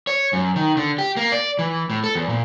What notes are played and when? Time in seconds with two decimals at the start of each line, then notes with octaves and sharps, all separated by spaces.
0.07 C#5
0.33 F#2
0.56 D#3
0.77 D3
0.98 G4
1.17 A#3
1.32 D5
1.59 E3
1.90 A2
2.04 A4
2.15 E2
2.29 A#2